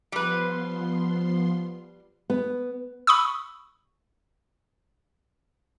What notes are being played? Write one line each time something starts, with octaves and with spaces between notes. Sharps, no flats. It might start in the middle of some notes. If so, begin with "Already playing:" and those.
F3 G3 B3 B4 C6
B3
B5 C#6 D#6 E6